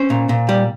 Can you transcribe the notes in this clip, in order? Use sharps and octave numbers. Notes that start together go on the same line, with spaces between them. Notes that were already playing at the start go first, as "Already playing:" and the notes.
Already playing: C#4 C5
A#2
A#2
G3